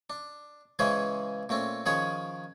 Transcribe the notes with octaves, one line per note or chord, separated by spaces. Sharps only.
D4
C#3 E3 G#3 C#4 G#4 C5
A#2 A3 C4 C#4
D#3 F3 C#4 G#4 C#5